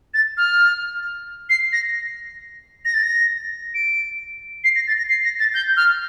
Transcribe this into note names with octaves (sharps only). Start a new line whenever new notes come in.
A6
F6
C7
A#6
A#6
A6
A#6
D7
C7
A#6
A6
A#6
C7
A#6
A6
G6
F6